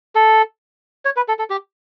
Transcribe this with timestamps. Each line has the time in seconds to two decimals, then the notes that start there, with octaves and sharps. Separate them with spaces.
0.15 A4
1.05 C#5
1.16 B4
1.28 A4
1.39 A4
1.50 G4